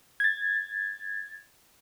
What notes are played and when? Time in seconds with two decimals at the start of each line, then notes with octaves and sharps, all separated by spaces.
0.20 G#6 A6